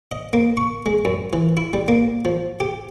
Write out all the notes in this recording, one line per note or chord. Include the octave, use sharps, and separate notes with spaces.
D#5
A#3
C#6
G#3
F#2
E3
E4
G3
A#3
F3
G4